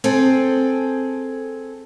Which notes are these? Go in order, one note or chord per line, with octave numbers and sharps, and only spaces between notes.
C4 G#4 A4